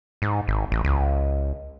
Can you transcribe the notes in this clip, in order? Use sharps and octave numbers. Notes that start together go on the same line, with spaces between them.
G#2
G#1
A1
C#2